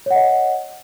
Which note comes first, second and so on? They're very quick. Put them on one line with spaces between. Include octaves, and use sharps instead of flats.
C#5 F#5 D#5